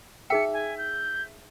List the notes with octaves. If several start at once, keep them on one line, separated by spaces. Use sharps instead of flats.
D#4 G#4 E5 G5 C#7
G#5
G6